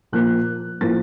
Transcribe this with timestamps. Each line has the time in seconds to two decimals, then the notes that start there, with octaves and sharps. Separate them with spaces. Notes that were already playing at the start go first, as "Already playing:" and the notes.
0.12 A#2 F3 A#3 F#6
0.81 A2 F3 A#3 A6